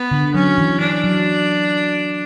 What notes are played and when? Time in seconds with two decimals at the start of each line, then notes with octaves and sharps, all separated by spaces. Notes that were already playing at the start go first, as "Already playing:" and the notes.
Already playing: B3
0.11 D3
0.34 F#3 C#4
0.58 E3
0.81 D4
1.04 F#3